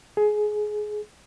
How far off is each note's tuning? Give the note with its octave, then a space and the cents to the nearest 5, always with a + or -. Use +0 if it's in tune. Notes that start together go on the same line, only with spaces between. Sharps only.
G#4 +20